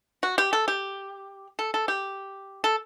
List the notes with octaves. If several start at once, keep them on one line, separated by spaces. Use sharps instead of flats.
F#4
G4
A4
G4
A4
A4
G4
A4